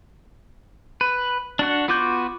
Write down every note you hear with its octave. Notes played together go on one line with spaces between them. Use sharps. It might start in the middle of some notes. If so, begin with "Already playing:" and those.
B4
D4 F#4 F#5
B3 F4 F#4 D6 G6